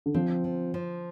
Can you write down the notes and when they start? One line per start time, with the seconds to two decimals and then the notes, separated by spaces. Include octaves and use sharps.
0.06 D3
0.14 F3 C4
0.44 F3
0.74 F3